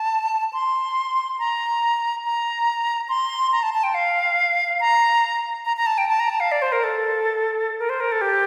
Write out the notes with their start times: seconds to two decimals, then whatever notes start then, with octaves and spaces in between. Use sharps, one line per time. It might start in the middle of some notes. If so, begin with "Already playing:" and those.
Already playing: A5
0.53 C6
1.39 A#5
2.24 A#5
3.09 C6
3.52 A#5
3.63 A5
3.74 A5
3.84 G5
3.94 F5
4.80 A#5
5.65 A#5
5.77 A#5
5.86 A5
5.98 G5
6.09 A5
6.20 A#5
6.29 A5
6.40 F5
6.52 D5
6.62 C5
6.72 A#4
6.84 A4
7.79 A#4
7.89 C5
8.00 A#4
8.12 A4
8.21 G4